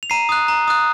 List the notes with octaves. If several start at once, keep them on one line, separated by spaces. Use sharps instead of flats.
F7
A#5 C7 D#7
D#6 F#6
A#5
D#6 F#6